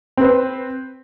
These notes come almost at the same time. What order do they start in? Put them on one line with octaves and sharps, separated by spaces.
C4 B4 C5